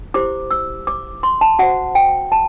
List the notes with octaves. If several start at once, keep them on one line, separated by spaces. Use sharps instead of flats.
E4 G4 C5 D6
E6
D6
C6
A5
F#4 C5 F#5
G5
A5